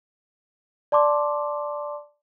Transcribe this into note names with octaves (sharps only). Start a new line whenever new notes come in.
D5 A5 C6 D6